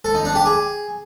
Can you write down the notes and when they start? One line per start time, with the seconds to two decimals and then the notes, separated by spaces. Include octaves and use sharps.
0.05 A4
0.15 D#4
0.25 D4
0.35 G4
0.46 G#4